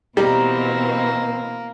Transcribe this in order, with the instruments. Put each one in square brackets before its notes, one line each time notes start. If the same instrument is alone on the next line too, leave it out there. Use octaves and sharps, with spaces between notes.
[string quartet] B2 E3 C4 [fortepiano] G3 [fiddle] A#3 [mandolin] D#4 A#5 D6